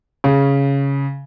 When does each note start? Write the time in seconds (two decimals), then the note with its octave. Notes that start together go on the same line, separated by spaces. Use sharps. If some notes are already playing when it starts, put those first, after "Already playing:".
0.24 C#3